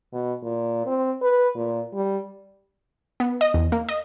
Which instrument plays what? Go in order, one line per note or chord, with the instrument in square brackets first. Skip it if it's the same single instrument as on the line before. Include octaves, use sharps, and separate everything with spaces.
[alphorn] B2
A#2
C4
B4
A#2
G3
[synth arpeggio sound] B3
D#5
E2
A#3
D#5